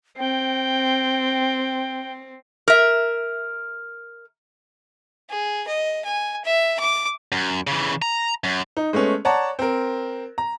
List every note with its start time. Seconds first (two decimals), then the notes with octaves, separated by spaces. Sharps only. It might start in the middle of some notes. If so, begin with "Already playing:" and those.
0.18 C4 G5
2.68 A#4 E5
5.30 G#4
5.68 D#5
6.05 G#5
6.45 E5
6.79 D6
7.32 F#2
7.67 C#3 E3
8.02 A#5
8.44 F#2
8.77 D#4
8.93 G#3 A3 B3 C#4
9.25 C#5 D5 F#5 A5 A#5
9.59 C4 A#4
10.38 A#5